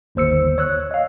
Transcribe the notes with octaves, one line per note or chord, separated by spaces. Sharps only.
G1 D#2 C5 E6 C#7
C#5 E6 F#6
D#5 F5